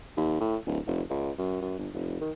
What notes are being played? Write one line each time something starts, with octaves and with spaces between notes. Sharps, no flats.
D#2
A2
D1
F1
C#2
F#2
F#2
G1
F1
D#3